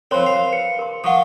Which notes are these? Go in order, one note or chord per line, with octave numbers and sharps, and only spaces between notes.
F3 C4 A#4 C5 C#5 B5 C6
F5
B4 C#7
A#4 C6
F3 F4 F#5 C#6 D#6